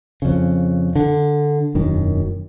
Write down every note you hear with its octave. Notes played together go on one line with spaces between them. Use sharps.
F2 C#3
D3
E1 F#2 D#3